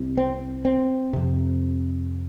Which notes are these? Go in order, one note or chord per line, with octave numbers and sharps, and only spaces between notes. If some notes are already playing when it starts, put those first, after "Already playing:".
Already playing: C2 C3
C4
C4
F2 C3